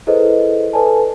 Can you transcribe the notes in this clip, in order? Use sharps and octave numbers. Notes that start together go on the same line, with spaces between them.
E4 G#4 A4 B4 C5 D#5
A4 B4 D5 G#5 A5